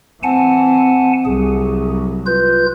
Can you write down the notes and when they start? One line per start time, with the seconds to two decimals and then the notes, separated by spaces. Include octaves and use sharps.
0.23 E3 C4 F#5 G#5 A5
1.25 C2 F#3 G#4
2.26 F4 B4 G6